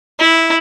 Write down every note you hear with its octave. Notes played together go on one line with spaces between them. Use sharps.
E4